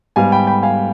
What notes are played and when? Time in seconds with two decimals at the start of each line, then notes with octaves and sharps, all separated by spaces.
0.16 G#2 G3 B3 F5 G#5
0.32 G5 B5
0.47 G5 B5
0.63 F5 G#5